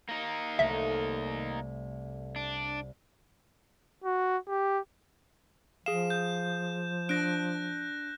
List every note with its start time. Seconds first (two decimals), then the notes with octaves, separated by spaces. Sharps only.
0.09 A#3 D#4
0.59 C2 A3 E5
2.36 D4
4.05 F#4
4.49 G4
5.86 F3 G#4 F5 E7
6.10 G6
7.09 D4 F#6 A#6 D7